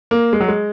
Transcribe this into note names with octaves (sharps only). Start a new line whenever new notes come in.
A#3
G#3
F#3
G#3